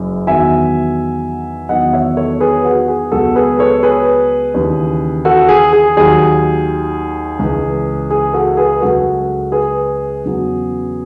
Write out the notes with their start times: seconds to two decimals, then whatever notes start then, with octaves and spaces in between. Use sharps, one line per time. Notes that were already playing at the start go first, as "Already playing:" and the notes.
Already playing: F#1 F#2
0.27 E2 D#3 F#3 E5 G#5
1.69 E2 D#3 F#3 D#5 F#5
1.93 C#5 E5
2.17 A4 C#5
2.40 G#4 B4
2.65 F#4
2.88 G#4
3.12 C#2 B2 F#3 F#4 A4
3.35 G#4 B4
3.59 A4 C#5
3.83 G#4 B4
4.54 D#2 C#3 E3
5.25 F#4 A4
5.49 G#4
5.73 G#4
5.97 D#2 D#3 F#3 G#4
7.39 C#2 C#3 E3
8.11 G#4
8.33 F#4 A4
8.57 G#4 B4
8.81 C#2 C#3 F#3 F#4 A4
9.52 G#4 B4
10.24 E2 C#3 F#3